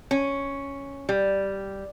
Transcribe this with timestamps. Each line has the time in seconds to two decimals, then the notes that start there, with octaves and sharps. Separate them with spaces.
0.11 C#4
1.09 G3